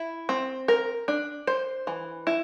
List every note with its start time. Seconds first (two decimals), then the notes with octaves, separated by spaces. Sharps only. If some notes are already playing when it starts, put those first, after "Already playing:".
Already playing: E4
0.29 C4
0.68 A#4
1.08 D4
1.47 C5
1.87 E3
2.27 E4